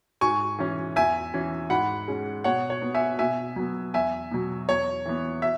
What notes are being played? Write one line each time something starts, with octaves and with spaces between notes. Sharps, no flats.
G#2 G#5 C#6
E3 C#4
E2 E5 G#5
E3 C#4
G#2 F#5 B5
G#3 C#4
B2 C#5 F#5
C#5
B3
E5 G#5
B2 E5 G#5
F#3 B3
E2 E5 G#5
B2 F#3
E2 C#5
E3 B3
E5